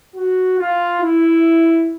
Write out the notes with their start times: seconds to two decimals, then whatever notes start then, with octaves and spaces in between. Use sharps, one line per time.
0.15 F#4
0.58 F4
1.01 E4